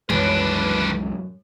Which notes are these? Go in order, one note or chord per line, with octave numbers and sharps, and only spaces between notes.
C2 F#2 D#3 E3 G#3 D4 B4